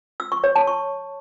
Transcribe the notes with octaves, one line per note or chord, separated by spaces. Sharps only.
E6
C#6
C#5
A5
C#6